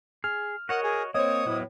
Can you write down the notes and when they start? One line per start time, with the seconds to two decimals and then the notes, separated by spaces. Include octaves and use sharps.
0.24 G#4 F6
0.69 F#4 A#4 C#5 D#5 F#5
0.83 G#4
1.14 A#3 C4 C5 C#5 D#5 D#6
1.46 A2 F#3 B3 E4